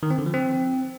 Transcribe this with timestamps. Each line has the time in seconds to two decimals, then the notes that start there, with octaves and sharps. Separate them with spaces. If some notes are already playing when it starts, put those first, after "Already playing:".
0.03 D#3
0.10 C4
0.18 D3
0.26 F3
0.34 C4